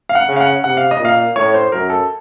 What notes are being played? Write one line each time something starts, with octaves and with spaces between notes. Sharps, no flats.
F5
F#5
C#3
F5
F#5
C3 F#5
F5
D#5
A#2
F5
A2 C#5
C5
F#2 A#4
A4